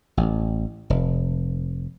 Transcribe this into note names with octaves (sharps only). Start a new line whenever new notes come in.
A1
F1